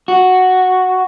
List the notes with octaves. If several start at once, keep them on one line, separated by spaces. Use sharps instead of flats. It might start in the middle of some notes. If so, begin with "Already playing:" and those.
F#4